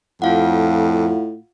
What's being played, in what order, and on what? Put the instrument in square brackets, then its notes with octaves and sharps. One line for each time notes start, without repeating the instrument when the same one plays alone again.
[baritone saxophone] F2 [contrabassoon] A2 [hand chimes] F4 F5 F#5